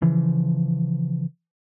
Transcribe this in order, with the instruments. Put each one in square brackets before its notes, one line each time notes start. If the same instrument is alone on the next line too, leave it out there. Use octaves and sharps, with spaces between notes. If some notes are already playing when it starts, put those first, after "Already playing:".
[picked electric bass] C#3 E3 F3